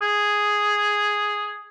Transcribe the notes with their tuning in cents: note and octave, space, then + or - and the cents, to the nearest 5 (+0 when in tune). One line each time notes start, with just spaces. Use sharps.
G#4 +0